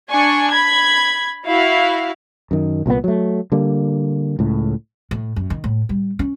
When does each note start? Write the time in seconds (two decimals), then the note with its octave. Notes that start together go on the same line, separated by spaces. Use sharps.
0.11 D4 G#5 C#6
0.51 B5 G#6
1.46 E4 F#4 F5
2.51 F#2 D#3
2.86 C2 A#2 E3 B3
3.04 F#3 A3
3.52 D3 G3 A#3
4.39 C#2 A2
5.11 A2
5.36 F#2
5.50 D#3
5.64 A2
5.89 G3
6.19 C#4